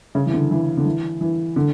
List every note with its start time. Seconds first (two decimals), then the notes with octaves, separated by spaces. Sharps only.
0.15 C#3
0.26 E3
0.33 D3
0.51 E3
0.77 D3
0.86 E3
1.21 E3
1.56 D3